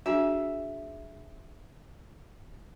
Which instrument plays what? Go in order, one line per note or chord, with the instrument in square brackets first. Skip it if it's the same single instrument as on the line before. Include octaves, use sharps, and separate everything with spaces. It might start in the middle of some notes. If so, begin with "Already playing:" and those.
[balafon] D4 F#4 G#5 [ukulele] G#4 E5